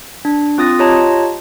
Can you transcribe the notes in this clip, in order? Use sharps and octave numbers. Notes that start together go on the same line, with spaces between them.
D4
C4 F4 D#6 A6 A#6
F4 G4 C#5 D#5 A5 A#5